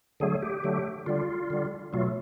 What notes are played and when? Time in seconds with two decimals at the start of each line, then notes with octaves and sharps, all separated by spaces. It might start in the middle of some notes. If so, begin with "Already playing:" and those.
0.20 D3 F#3 A3 G#4
0.42 G4
0.64 D3 F#3 A3
1.06 D3 G3 F4
1.50 D3 G3
1.93 B2 F#3 A3 F4